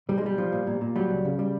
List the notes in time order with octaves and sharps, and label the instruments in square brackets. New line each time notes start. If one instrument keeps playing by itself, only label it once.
[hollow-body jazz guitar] B1 G3
G#3
B1 G3
F3
A#2
A#2
A#2
F#3 G3
C#2
C#3
G3